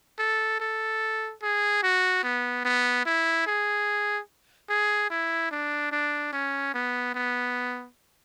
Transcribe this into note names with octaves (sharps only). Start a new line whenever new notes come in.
A4
A4
G#4
F#4
B3
B3
E4
G#4
G#4
E4
D4
D4
C#4
B3
B3